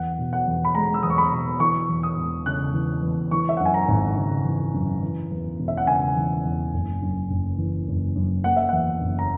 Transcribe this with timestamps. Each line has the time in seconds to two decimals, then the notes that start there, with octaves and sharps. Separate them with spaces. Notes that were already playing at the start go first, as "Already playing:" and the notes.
Already playing: E2 F#5
0.18 B2
0.33 F#5
0.47 E2
0.65 B5
0.75 G#3 A#5
0.94 E6
1.03 E2 D#6
1.10 C#6
1.18 B5
1.32 B2
1.60 E3 C#6
1.89 E2
2.03 D#6
2.17 E1
2.46 C#3 F#6
2.74 E3
3.02 E2
3.31 E3 C#6
3.49 E5
3.57 F#2 F#5
3.66 G#5
3.74 A#5
3.88 G#1
4.17 C#3
4.45 E3
4.74 F#2
5.02 E3
5.31 E2
5.59 E1
5.68 E5
5.77 F#5
5.87 C#3 G#5
6.16 E3
6.45 E2
6.74 F#1
7.02 F#2
7.30 F#1
7.58 E3
7.88 F#1
8.15 F#2
8.44 A#3 F#5
8.56 E5
8.69 E2 F#5
9.01 F#1
9.19 A#5